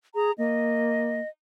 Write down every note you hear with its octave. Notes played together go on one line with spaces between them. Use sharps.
G#4 A#5
A#3 D#5